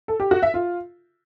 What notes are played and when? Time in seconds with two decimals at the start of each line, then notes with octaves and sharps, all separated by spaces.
0.08 A4
0.20 G4
0.31 F#4
0.43 E5
0.54 F4